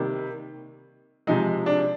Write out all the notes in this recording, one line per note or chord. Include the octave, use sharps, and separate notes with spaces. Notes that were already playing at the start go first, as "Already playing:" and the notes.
Already playing: C3 D#3 G3 A#3
C3 F3 G#3 D#4
D4